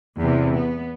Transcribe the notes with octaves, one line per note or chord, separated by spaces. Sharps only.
E2 C3
B3